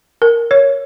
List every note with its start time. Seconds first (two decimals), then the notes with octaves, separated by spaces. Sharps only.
0.22 A#4
0.51 C#5